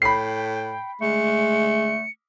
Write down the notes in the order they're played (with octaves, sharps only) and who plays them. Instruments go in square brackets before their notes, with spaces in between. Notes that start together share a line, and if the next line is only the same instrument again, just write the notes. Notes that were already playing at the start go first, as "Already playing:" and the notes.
[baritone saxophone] A2 [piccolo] G5 [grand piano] B5 C7
[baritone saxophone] G#3 [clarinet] A3 [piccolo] C#7